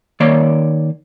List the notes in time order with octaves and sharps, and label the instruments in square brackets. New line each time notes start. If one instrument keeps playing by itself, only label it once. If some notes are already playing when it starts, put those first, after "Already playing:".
[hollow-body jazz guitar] D#3 A#3 C#5 D5